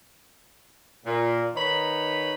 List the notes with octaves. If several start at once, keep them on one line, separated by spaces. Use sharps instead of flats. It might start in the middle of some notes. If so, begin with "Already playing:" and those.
A#2
D#3 D#4 B4 C#5 B5